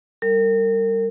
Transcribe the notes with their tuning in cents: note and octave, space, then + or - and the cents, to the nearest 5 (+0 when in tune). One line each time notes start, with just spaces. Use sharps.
G3 +0 A#4 -35